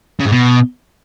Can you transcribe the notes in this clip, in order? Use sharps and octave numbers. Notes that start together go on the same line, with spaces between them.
C#3
G#2
B2